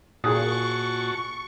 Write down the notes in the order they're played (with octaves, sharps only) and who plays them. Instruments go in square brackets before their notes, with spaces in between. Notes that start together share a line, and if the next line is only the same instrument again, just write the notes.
[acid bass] A#2 [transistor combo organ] F#4 A5 [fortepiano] G#4 D#6 [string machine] C#6